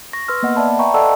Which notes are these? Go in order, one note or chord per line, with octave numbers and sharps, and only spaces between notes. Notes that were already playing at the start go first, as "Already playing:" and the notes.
C#6 A#6
B4 C6 E6 F6
A#3 B3 D#5 F#5
D5 E5 A5 B5
B4 E5 G5 A#5 B5 C#6
A4 D5 D#5 F#5 A5 E6